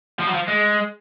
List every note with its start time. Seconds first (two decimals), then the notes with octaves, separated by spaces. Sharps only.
0.20 F3
0.27 F#3
0.34 F3
0.48 G#3